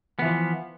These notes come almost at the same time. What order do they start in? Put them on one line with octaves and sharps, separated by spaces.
B3 E3 F3